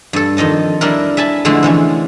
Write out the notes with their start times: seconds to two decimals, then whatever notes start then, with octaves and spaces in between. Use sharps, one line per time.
0.13 G2 A4
0.37 F2 D#3 D#5 A5
0.81 G3 D4 E4 A#4
1.17 E5 G#5 A5 B5
1.45 F2 D3 G#3 A3 B3 E4
1.63 C3 E3 C#4